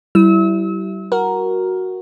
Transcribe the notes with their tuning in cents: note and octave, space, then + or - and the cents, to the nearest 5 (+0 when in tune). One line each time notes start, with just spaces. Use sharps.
G3 -35 E4 +0 E6 -40
F#4 +0 A#4 +5